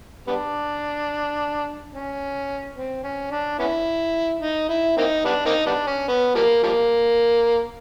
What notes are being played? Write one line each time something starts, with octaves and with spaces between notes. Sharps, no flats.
G3 B3 D4
C#4
C4
C#4
D4
B3 C#4 E4
D#4
E4
A#3 C4 D#4
G3 B3 D4
A#3 C4 D#4
G3 B3 D4
C#4
B3
F3 G3 A#3
F3 G3 A#3